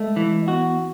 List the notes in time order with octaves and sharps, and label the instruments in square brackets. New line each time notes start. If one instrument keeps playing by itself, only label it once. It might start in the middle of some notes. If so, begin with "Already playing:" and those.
Already playing: [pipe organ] G#3 [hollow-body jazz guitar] A3
[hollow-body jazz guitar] E3
[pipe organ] B3 [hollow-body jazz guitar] F#4